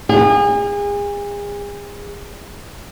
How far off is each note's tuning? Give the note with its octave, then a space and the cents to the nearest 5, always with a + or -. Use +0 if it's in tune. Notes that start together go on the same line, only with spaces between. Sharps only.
G#4 -35